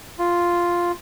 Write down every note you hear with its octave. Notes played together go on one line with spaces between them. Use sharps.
F4